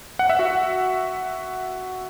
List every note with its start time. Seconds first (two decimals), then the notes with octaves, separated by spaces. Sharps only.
0.19 F#5
0.30 E5
0.39 F#4 F#5